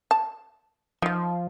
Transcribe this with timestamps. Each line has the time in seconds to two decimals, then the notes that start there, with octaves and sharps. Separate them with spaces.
0.11 A5
1.02 F3 D#4 F4